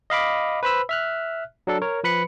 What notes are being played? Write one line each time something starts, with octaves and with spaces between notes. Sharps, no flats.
D#5 F5 B5 D6
B4 C5 B5 E6
E5 F6 F#6
F#3 D4 A4
A#4 C#5
F3 B4 B5 C#7